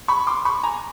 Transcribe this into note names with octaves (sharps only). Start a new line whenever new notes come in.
B5 C#6
C6 D6
B5 C#6
G#5 A#5